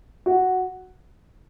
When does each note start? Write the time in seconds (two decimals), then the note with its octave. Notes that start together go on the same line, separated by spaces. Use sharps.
0.26 F#4